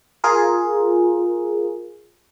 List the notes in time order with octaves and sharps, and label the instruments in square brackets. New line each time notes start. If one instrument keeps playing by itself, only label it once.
[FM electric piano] F4 G#4 A#4